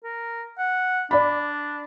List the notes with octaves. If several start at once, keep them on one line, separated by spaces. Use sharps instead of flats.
A#4
F#5
D4 D5 B5